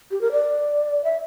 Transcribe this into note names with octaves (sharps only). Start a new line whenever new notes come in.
G4
A#4
D5
E5